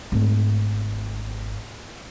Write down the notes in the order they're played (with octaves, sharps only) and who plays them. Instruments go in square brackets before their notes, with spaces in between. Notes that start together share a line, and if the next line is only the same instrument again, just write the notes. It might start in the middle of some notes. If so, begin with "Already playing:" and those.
[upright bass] G#1 A3